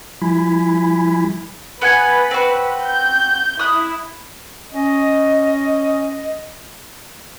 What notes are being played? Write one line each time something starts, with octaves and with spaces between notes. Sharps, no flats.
F3 G3 E4 G#5 B5
B3 B4 F#5 G#5
C4 F#4
G6
E4 D#6 F#6
C#4 D#5